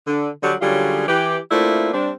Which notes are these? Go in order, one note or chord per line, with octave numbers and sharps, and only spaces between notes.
D3
D3 F#3 G3
D3 F#3 G3 C#4 F4 G#4
E3 G4
A3 A#3 C4 D4 E4 F4
G3 C4 D4